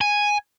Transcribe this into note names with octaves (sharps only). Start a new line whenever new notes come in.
G#5